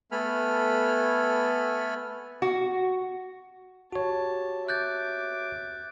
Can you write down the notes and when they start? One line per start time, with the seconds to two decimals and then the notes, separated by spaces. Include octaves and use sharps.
0.12 A3 B3 A4 G#5 B5 F6
2.42 F#4
3.93 F#4 G4 C#5 A5
4.69 E5 D6 F#6 G6 A6